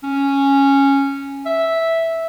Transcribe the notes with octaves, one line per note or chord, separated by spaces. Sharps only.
C#4
E5